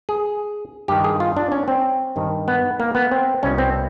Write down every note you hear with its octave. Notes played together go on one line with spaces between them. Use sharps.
G#4
G2 D#3 G4
G#4
F4
D4
C#4
C4
G2 D#3
B3
A#3
B3
C4
C2 B2 C#4
C4